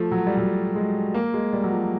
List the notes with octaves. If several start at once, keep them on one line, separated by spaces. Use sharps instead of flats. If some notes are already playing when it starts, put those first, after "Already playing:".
Already playing: F3 A3
F#3
G3
F#3
G#3
A#3
G#3
G3
F#3
F3